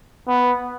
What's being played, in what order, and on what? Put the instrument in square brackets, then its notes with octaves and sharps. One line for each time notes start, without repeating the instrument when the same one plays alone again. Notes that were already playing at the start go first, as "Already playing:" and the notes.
[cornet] B3